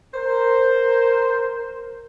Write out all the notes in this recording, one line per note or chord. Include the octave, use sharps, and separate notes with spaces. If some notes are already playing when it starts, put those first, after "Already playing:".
A#4 C5